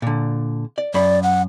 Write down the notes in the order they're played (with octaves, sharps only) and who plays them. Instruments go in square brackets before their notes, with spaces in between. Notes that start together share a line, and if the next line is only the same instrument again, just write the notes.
[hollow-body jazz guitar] A#2 D3
D5
[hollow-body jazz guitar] F#2 B5 [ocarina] D5
[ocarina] F#5